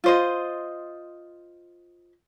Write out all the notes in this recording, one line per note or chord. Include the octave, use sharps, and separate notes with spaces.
F4 C5 D#5